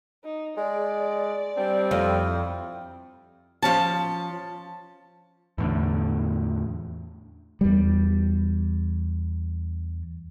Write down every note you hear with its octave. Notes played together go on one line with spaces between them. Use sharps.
D#4
G#3 D5
G3 C4 D4
F2 E4
F3 C#4 A5
E2 A2 D3
E2 G3